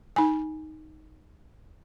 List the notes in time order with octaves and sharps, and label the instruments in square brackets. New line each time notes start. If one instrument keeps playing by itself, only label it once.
[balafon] D#4 G#5